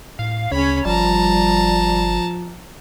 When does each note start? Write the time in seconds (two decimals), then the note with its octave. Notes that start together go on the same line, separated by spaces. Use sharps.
0.19 A2 F5
0.52 D2 C#3 C#4 C#5 B5
0.85 G1 F3 G3 A5 A#5